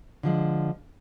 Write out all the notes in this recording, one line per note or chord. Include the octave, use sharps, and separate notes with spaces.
D3 F3 G#3